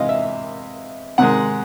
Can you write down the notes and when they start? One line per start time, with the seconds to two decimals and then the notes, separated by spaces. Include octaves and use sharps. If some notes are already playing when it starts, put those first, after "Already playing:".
Already playing: C3 E3 G#3 D#5 F5
0.09 E5
1.18 C3 D#3 G#3 F#5